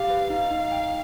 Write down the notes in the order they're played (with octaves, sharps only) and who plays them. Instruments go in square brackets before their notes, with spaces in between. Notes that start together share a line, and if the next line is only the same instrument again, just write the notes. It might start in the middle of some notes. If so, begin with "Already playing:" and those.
Already playing: [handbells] G4 [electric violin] F5
[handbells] B4
[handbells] D#4 [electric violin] F5
[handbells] D#4
G5